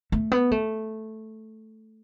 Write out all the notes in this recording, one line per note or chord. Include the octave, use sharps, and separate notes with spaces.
A3
B3
A3